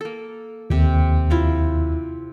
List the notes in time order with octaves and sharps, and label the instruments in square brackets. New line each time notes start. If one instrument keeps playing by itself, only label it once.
[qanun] A#3 A4
[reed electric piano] D#2 [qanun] C3 G4
[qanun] E4 F4 A#5